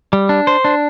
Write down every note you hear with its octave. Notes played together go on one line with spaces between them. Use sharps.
G3
D4
C5
D4